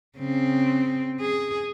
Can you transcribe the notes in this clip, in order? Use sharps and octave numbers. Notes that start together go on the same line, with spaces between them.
C#3 C4
G#4